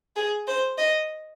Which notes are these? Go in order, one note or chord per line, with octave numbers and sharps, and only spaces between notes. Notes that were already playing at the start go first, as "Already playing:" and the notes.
G#4
C5
D#5